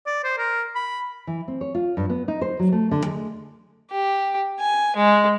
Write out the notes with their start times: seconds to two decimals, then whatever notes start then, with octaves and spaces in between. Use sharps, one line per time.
0.06 D5
0.24 C5
0.38 A#4
0.75 B5
1.27 E3
1.48 C4
1.61 C#5
1.74 F4
1.97 G2
2.09 B3
2.28 D#4
2.41 C5
2.59 F#3
2.72 A3
2.91 D3
3.06 G#3
3.91 G4
4.60 G#5
4.96 G#3